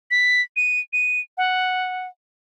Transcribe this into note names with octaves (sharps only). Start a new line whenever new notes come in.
B6
D#7
D#7
F#5